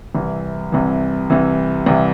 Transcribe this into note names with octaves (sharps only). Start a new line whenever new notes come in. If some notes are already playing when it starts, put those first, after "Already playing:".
C2 C3 E3
C2 C3 E3
C2 C3 E3
C2 C3 E3